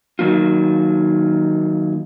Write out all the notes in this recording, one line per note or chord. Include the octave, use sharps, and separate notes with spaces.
D#3 F#3 A#3 F4